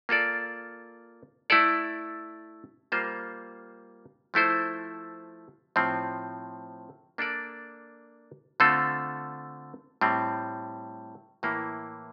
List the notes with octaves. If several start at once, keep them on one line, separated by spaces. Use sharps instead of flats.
A#3 F4 A4 D5
A3 E4 A4 D5
G3 A#3 F4 C5
F3 A3 E4 A4 C5
A2 F3 C4
A#3 D4 A4 D5
D3 A3 C4 F4 A4
A2 G3 C4
A2 E3 A#3 E4